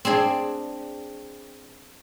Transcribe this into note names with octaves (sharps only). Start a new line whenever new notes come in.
C4 D4 G#4 D5